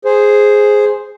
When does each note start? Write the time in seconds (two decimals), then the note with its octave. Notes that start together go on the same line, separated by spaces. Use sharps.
0.05 G#4 C5